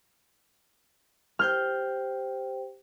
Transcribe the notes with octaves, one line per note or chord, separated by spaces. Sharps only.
G4 C5 G5 F6 G6